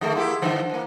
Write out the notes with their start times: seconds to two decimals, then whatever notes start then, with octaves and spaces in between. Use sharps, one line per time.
0.01 D3 D#3 A3 G#4 D#6
0.15 A#3 E4 G4 F#5 C6
0.42 G2 D3 E3 C5 F#5
0.70 E3 A#3